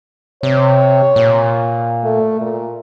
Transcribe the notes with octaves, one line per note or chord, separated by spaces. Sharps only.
C3 C#5
A#2
A3
A#2